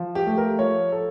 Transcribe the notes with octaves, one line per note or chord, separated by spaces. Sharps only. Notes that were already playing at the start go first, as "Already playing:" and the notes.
Already playing: F3
G4
A3
A#4
F3 C#5
A4